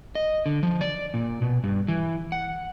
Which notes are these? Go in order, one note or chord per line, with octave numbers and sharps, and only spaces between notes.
D#5
D3
F3
D5
A#2
B2
G2
E3
F#5